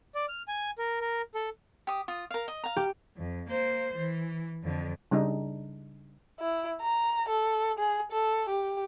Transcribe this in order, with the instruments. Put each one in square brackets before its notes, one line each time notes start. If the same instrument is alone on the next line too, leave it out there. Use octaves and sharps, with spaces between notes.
[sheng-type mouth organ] D5
F6
G#5
A#4
A#4
A4
[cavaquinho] G4 D#6
F4 D#6
A#4 F5
D#5
F5 A#5
[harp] G4
[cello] F2
A#3 C5
E3
F2 D3
[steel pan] C#3 G3 D4 D#4
[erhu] E4
A#5
A4
G#4
A4
G4